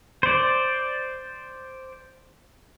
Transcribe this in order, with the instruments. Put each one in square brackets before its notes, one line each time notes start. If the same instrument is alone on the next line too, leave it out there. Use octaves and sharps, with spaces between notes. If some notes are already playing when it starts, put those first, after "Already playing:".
[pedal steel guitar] C5 D5